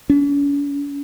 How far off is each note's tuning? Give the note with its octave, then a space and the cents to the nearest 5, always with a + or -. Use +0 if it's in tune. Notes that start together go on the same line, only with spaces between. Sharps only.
C#4 +45